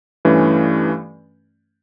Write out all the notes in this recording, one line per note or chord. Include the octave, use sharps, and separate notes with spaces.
G2 E3 A3 C#4